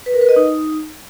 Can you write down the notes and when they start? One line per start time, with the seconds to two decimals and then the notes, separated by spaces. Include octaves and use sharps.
0.06 B4
0.14 A#4
0.21 B4
0.29 D#5
0.36 D#4